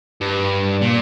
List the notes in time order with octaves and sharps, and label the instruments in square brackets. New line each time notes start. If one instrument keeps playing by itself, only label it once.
[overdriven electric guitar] G2
A#2